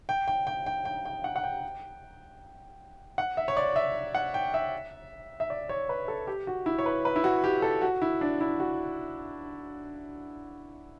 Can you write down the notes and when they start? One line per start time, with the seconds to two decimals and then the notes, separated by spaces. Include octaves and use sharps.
0.09 G5
0.28 G5
0.47 G5
0.66 G5
0.85 G5
1.05 G5
1.24 F#5
1.36 F#5
1.44 G5
3.18 F#5
3.37 E5
3.48 C#5
3.57 D5
3.76 E5
4.15 F#5
4.34 G5
4.54 E5
5.40 E5
5.50 D5
5.69 C#5
5.89 B4
6.08 A4
6.27 G4
6.47 F#4
6.66 E4
6.79 C#5
6.86 B4
7.05 B4
7.16 E4
7.24 F#4
7.44 G4
7.62 A4
7.82 F#4
8.02 E4
8.21 D4
8.41 E4
8.60 F#4